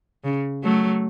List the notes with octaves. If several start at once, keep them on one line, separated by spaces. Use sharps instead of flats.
C#3
F#3 A3